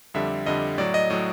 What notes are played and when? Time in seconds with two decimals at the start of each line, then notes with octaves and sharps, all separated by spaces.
0.14 F2 D3 G3 E5
0.46 F2 D3 G3 D#5
0.78 A2 F#3 D5
0.94 D#5
1.10 A2 F#3 D#5